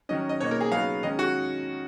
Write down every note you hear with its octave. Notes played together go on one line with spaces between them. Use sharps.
D#3 F#3 C#4 D#5
D#5
B2 A#3 D#4 C#5
A#4
G#4
C#3 F#3 B3 D#4 F5
D#3 G#3 C#4 D#5
F#4